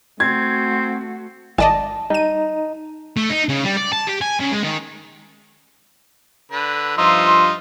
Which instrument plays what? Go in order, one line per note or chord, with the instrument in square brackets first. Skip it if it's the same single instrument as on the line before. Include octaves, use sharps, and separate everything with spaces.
[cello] A3 F#4 [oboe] C4 [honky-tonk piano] G#6
[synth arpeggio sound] G#1 D5 D#5 [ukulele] A5
[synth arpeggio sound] G3 D#7 [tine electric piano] D#4
[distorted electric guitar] A3
D#4
C#3
G3
D5
A5
G4
G#5
C#3
G#3
D#3
[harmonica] D3 B4
[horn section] G2 F3 C6 [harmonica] D#4 F4 E5